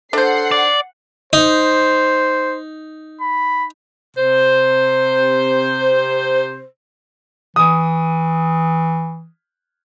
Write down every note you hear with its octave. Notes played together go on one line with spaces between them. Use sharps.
D4 A4 C5 F#5 C7
D5
D#4 C5
B5
C3 C5
E3 D#6